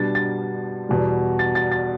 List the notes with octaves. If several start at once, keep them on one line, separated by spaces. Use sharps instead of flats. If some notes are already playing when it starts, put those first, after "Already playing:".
Already playing: B2 G3 D4 A6
A6
E2 B2 G3
A6
A6
A6